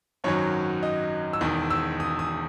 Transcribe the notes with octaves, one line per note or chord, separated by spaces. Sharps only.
G#1 F#2 D#3 F#3 C#5
D#5
E6
E1 E2 D#3 D#6
E6
D#6
D#6